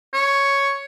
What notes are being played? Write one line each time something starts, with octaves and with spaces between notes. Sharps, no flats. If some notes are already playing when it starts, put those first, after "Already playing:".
C#5